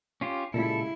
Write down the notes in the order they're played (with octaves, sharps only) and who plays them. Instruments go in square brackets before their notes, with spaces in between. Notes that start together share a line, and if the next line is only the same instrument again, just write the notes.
[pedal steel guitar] C#4 F4 G4
[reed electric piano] A#2 [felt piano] C#3 G3 G#3 [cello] E4 [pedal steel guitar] A4